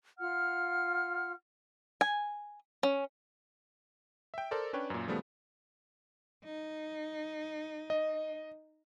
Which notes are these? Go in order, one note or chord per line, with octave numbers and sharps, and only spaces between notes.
F4 F#5 F6
G#5
C#4
E5 G5
A4 A#4 C5 D5
C#4 D4 B4 C#5 G5
F#2 A#2
C#3 F3 G3 A3 B3
D#4
D#5